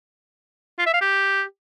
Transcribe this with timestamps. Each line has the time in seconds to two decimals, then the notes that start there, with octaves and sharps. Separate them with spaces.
0.78 F4
0.86 E5
0.94 F5
1.01 G4